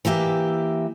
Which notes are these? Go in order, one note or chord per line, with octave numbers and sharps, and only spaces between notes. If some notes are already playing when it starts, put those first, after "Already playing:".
E3 A#3 G4 E5